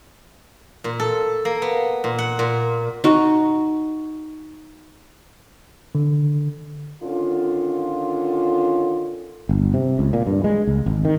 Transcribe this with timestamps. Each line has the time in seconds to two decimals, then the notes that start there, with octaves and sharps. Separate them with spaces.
0.84 A#2
1.00 A4
1.45 A#3
1.62 B3
2.04 A#2
2.19 F#5
2.39 A#2
3.04 D#4 F#4
5.95 D3
7.03 D3 D#3 C#4 F4
9.49 G1
9.74 C3
9.99 C#2
10.13 A#2
10.27 G2
10.44 G#3
10.67 C#2
10.86 G#1
11.05 D#3